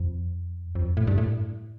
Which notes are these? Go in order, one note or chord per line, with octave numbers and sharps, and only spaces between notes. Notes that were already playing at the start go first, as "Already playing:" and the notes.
Already playing: F2
F2
A2
G2
A2